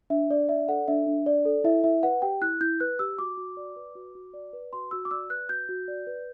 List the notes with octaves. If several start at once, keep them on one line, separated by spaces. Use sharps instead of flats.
D4 E5
D4 D5
D5 E5
A4 F#5
D4 E5
D4
D5
A4
E4 E5
E4 E5
B4 F#5
G4 G5
E4 F#6
E4 G6
B4 F#6
G4 E6
F#4 D6
F#4
D5
B4
F#4
F#4
D5
B4
F#4 C6
F#4 E6
D6
D5 E6
B4 F#6
F#4 G6
F#4
D5
B4